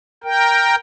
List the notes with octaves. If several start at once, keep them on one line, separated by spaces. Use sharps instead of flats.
A#4 G5